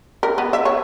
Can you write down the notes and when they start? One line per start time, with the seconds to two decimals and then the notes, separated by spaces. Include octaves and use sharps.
0.23 A#4
0.38 B3
0.53 E5
0.65 C#5